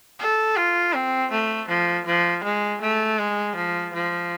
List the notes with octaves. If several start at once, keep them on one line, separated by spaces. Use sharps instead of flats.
A4
F4
C4
A3
F3
F3
G#3
A3
G#3
F3
F3